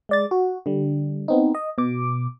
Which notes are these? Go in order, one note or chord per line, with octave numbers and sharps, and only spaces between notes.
G#3 D5 A6
F#4
D3 G3
B3 C4 D#4
D#5
B2 D6